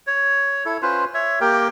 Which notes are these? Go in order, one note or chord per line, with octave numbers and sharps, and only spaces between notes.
C#5
E4 A4
C#4 F4 B4 C5
C#5 E5
A#3 G4 A#4 G5